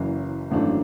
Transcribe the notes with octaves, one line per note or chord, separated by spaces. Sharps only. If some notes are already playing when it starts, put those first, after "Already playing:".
Already playing: F#1 F#2 E3
G#1 F#2 E3 A3 D4